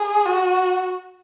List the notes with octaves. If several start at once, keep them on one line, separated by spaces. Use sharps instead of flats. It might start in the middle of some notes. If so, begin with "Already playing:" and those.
Already playing: G#4
F#4